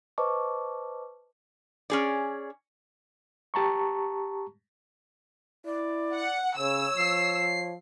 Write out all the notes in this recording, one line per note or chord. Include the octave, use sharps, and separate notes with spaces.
B4 C5 D#5 A5 C#6 D6
C#4 G#4 D5
G4 A5 A#5 C#6
E4 D5
F#5
C#3 C#5 E6
F3 C7